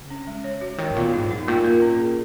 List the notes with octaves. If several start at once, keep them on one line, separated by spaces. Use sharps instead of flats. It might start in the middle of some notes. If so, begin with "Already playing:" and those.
Already playing: C#3
C#4
G#3
C#5
F#4
D#3 C#5
G#2
A#2 B3
G#2 D#4
F#2 D#4
A#2 A#3
A#4
C#4
G#4